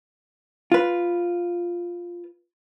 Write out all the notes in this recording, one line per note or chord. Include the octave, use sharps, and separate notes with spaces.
F4 B4